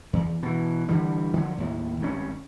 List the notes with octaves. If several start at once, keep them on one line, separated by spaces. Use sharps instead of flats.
E2
B2 E3
D3 E3 G3
D3 F3 F#3
D#2 A2
G#1 G2 C3 C#4